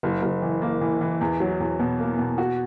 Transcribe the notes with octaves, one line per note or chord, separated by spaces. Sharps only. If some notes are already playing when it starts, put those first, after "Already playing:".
F#1
F#1
E3
A#3
E3
E3
E2
F#3
E2
B2
A#3
B2
F#4